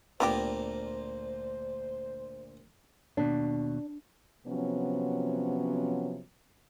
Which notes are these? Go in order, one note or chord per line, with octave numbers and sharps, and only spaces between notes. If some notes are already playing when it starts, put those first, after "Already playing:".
D2 A#2 B3 F4 G4 A#4 C5
D#2 B2 D4
C3 F3 F#3 B3 C#4